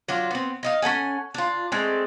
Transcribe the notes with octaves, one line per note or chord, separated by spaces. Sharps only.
F#3 D4 F4
B3 C4
D#4 D#5 F5
C#4 A4 F#5 G#5
D4 F4
G#3 A3 C4 D5